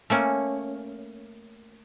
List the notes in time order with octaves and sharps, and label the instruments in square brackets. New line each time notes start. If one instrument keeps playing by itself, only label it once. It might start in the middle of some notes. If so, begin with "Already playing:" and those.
[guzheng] A3 A#3 C#4